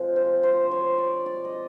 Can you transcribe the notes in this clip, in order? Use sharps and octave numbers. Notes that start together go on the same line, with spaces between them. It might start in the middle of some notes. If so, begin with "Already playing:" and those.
Already playing: C3 F3 G#3
C5
C5
C#5
D5
D5
D#5